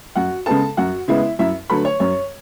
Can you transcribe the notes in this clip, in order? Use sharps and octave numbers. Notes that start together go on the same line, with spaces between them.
F#2 F#4 F#5
C#3 G#3 B3 A4 A5
F#2 F#4 F#5
C#3 G#3 B3 E4 E5
F#2 E4 E5
D3 F#3 A3 B4 B5
C#5 C#6
F#2 C#5 C#6